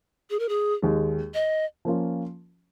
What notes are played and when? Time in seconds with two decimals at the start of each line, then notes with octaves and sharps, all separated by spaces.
0.30 G#4
0.39 A#4
0.49 G#4
0.82 D#2 D#3 G#3
1.34 D#5
1.85 F3 A#3 C#4 F4